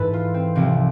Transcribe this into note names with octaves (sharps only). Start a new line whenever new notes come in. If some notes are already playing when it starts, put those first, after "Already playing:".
Already playing: G#2 E3 A4 B4
F4
C4
C2 C3 F3 C4